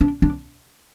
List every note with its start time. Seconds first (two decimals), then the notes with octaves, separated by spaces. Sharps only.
0.01 D4
0.22 D4